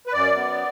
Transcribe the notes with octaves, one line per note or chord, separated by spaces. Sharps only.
B4
F#2 D5
B3